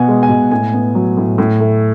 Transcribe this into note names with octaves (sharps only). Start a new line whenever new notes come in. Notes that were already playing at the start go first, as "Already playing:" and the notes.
Already playing: B2 B3 F#5 G#5
G#3
G#5
B2
A2 G#5
B3
F#3
A2
A2
A3